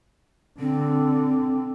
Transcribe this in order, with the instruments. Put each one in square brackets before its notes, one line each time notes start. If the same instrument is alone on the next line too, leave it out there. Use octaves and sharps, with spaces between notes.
[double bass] D3 [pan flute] C4